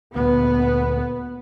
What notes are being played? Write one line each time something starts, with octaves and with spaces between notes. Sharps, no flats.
D2 A#2 B3